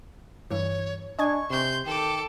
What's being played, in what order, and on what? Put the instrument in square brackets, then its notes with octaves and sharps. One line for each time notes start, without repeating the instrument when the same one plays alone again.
[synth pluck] G2 E3 [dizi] C#5
[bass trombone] D4 [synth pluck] D#5 G#5 G#6 [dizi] C#6
[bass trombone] C3 [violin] C6 G6
[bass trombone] D#3 [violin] A4 D6 [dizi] G5